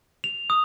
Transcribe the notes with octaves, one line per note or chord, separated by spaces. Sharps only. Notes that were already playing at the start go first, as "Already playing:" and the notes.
F7
D#6